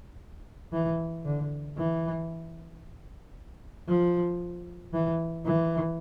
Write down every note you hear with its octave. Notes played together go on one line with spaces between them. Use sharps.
E3
D3
E3
F3
E3
E3